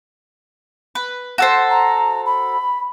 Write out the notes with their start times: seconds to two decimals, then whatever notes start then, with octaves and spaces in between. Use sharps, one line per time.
0.95 B4
1.38 F#4 A4 C5
1.70 A#5
2.26 B5